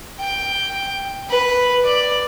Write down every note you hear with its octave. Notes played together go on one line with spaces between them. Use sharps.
G5
B4
D5